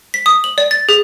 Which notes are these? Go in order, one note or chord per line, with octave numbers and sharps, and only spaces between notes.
B6
D#6
F#7
D5
A6
G#4